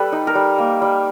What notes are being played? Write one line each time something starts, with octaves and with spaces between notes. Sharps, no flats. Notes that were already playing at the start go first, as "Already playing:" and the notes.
Already playing: G3 A4 B4
D#4
A#4
G3
A#3
G3